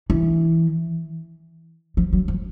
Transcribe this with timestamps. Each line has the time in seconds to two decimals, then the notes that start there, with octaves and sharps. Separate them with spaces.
0.10 E3
1.97 F3
2.13 F#3
2.28 F3